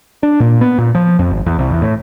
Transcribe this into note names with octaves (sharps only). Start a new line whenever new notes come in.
D4
A#2
B3
A#2
F3
F2
G#1
E2
C2
E2
A2